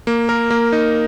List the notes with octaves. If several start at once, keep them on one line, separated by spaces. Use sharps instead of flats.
A#3
A#4
A#3
D#4